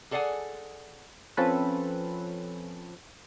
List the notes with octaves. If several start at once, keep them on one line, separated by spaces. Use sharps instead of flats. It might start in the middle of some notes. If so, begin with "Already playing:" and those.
G#4 A4 D5 F5 F#5 G#5
F3 C4 C#4 A4 B4